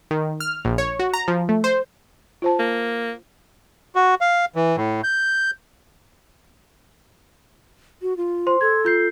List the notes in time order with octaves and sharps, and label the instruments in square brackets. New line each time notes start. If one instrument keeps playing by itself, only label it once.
[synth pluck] D#3
F6
A#1
C#5
F#4
A#5
F3
A3
C5
[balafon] F4 C5 A5
[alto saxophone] A#3
[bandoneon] F#4
F5
E3
A2
G6
[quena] F#4
F4
[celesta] C5 C6
[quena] A4 [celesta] C6 G#6
[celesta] F4 G6 C7